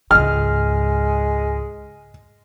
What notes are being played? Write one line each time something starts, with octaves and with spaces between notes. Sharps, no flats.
C#2 G#2 G#3 F6